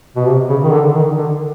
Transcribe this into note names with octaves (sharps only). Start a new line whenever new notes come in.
B2
C3
C#3
D#3
D3
D#3
D3